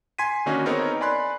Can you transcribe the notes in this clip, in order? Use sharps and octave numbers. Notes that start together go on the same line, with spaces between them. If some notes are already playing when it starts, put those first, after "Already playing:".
G#5 C6 G#6 B6 D#7
D3 D#3 A#3 C#4 D#4 F#4
B3 C4 D#4 G#4 A#4 C#5
D5 G#5 B5 C6 F#6